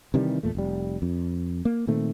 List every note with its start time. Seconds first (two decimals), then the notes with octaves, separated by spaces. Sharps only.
0.14 C3 D#3 E3 G3
0.43 E2 A#2 A3
0.55 F1 G3
1.02 F2
1.65 A#3
1.87 A#2 D#3 A3 C4